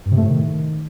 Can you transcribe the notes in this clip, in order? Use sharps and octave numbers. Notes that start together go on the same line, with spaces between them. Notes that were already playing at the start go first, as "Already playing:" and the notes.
G2
C3
A3
A2
D#3